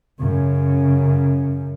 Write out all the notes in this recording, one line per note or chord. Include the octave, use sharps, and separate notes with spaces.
F#2 C#3